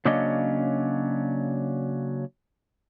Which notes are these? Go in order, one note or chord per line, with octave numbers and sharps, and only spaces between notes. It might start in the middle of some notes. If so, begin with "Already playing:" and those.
C#3 F#3 A#3 C#4 D4 D#5